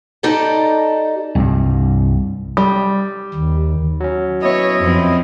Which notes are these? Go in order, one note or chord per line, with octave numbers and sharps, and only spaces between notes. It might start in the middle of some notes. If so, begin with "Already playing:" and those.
D#4 G4 A4 D5 D#5
C2 G2
G3
D#2
F#3 C#4
B3 E4 C#5 D#5
F2 F3 C4